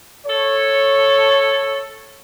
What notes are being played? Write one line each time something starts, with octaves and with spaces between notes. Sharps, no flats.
A4 C#5